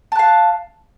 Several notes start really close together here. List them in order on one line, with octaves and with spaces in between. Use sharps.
A5 F#6 F5